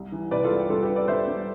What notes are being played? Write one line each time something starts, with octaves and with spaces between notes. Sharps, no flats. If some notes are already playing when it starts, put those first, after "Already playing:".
Already playing: C2
E3
C3 B4 D5
F4 A4
C2
G4
G3 F4 A4
G4 B4
D4
B4 D5
G3 C5 E5
G3